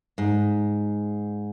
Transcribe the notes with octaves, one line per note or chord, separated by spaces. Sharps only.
G#2